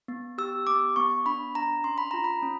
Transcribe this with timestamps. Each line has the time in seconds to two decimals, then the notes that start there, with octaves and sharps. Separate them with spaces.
0.08 B3
0.38 G4 E6
0.67 B3 D6
0.96 B3 C#6
1.26 D4 B5
1.55 D4 A#5
1.84 C#4 C6
1.98 B5
2.11 F4 A#5
2.24 B5
2.43 C#4